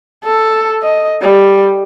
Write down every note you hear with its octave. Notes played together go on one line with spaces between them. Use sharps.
A4
D#5
G3